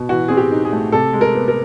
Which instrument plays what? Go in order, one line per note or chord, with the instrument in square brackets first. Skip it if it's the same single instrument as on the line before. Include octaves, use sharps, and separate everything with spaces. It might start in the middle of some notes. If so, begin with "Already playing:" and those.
Already playing: [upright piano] B2
E3 F#4
C4 G#4
G4
D#4
G#4
A3
C3 A4
G#3
A#4
B3
A#4